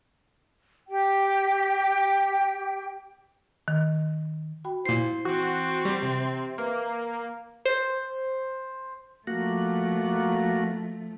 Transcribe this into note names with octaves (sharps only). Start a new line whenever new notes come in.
G4 G5
D#3
F#4 G5 B5
A#2 E4 C5 C7
E3 C4 F#4
G3
C3
A#3 B4 E5 F6
C5
F3 A3 A#3 F#4